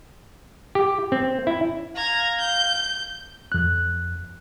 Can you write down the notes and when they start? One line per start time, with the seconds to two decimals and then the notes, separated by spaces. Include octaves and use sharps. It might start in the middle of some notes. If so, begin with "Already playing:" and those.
0.75 G4
1.12 C4
1.47 E4
1.95 F5 A#5 G#6
2.39 G6
3.52 F2 F#6